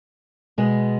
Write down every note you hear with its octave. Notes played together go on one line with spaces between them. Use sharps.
B2 G#3 B3